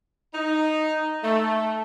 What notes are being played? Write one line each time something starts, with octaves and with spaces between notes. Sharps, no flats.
D#4
A3